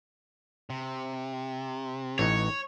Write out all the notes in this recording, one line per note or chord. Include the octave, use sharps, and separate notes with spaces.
C3
A1 E3 D#4 C#5